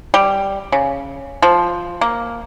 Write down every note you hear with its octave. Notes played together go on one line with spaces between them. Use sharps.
G3
C#3
F3
A#3